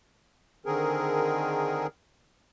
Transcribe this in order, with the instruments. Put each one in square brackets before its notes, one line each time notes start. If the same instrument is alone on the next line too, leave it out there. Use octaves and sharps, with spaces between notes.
[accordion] D3 D#3 C4 G#4 A#4